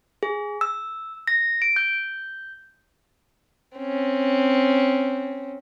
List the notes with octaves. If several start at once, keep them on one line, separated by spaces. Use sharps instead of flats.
G#4
E6
A#6
D7
G6
C4 C#4